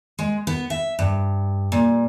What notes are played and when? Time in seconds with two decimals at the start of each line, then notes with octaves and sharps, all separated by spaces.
0.19 G#3
0.47 B3
0.70 E5
0.99 G2
1.72 A#2